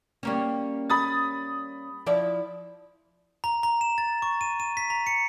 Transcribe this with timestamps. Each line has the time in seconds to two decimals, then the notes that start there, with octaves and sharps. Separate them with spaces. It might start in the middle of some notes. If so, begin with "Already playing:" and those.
0.23 G3 A#3 C#4
0.90 B5 D#6 A6
2.06 F3 E4 D5
3.44 A#5
3.63 A#5
3.81 E7
3.98 A6
4.22 C#6
4.41 D#7
4.60 D#7
4.77 B6
4.90 A#5
5.07 C#7